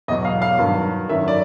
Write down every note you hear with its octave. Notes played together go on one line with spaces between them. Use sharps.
E2 B2 F#3 D#5
F5
F5
G2 D#3 F#3
F#2 D#3 F#3 E5
D5